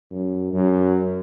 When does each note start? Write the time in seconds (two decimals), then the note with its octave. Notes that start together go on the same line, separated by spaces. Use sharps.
0.11 F#2
0.53 F#2